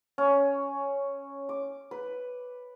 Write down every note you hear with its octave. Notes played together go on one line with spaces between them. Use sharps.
C#4
D6
B4